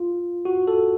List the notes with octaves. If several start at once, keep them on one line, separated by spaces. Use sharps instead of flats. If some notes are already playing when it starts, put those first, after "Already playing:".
Already playing: F4
F#4
A4